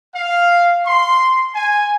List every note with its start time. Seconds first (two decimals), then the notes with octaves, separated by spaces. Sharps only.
0.15 F5
0.87 C6
1.55 G#5